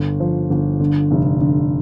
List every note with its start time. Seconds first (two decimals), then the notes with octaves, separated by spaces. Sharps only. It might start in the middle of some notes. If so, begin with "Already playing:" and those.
Already playing: G1
0.20 F3
0.50 G1
0.80 D3
1.11 F1
1.41 D3